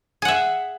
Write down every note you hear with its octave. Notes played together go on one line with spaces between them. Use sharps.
G#4 E5 F#5